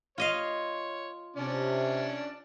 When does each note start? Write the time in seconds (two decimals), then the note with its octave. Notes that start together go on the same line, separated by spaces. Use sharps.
0.18 F4 C#5 D#5 F5
1.36 C3 C#4 D4 D5